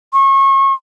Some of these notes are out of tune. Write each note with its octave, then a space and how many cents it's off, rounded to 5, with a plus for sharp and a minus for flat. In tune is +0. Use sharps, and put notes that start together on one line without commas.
C#6 -35